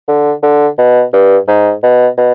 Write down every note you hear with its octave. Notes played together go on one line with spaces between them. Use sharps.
D3
D3
B2
G2
G#2
B2
B2